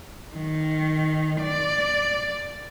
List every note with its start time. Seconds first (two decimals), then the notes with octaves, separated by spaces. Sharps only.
0.36 D#3
1.41 D5